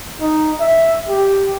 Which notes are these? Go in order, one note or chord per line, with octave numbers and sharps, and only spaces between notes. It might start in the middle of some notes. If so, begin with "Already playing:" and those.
D#4
E5
G4